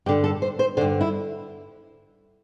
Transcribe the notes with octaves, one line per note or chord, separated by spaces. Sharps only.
G2 D3 G4
A4
C5
C5
G2 D3 C5
E4